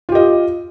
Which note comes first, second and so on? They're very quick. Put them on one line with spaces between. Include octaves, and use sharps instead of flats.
F4 G4 D#5